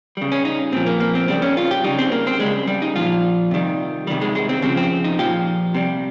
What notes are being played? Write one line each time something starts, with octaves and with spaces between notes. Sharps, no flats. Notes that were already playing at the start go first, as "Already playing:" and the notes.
C#3 G3
C#4
D#4
A#2 F3 C4
A#3
A#3
C4
C#3 G3 C4
C#4
F4
G4
C#3 G3 D#4
C4
A#3
C4
C#3 G3 G#3
G3
D#4
A#2 F3 F4
C3 D#3 G3
C3 D#3 G3
G#3
G#3
C4
C#3 F3 C4
C4
D#4
A#2 F3 G4
C3 G3